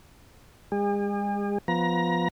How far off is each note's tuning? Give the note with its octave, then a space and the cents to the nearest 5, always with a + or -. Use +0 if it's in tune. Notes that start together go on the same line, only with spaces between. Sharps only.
G#3 -40 G#4 -45
F3 +0 B3 +0 A#5 +25